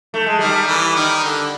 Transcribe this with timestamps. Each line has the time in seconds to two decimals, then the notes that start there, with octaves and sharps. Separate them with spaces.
0.14 A3
0.26 G#3
0.39 D#3 G3
0.67 E3
0.96 D#3
1.24 D3